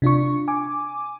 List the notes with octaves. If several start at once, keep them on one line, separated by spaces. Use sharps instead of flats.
C3 D4 F4 C#6
G#5 D6